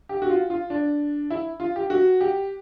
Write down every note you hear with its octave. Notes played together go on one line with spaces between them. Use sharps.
G4
F#4
F4
F4
D4
E4
F4
G4
F#4
G4